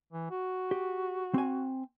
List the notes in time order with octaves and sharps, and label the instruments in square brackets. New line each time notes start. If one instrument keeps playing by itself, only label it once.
[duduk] E3
F#4
[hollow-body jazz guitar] G4
C4 G#5